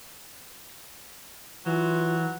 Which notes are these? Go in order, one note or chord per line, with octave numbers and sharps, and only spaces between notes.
E3 F#3 F4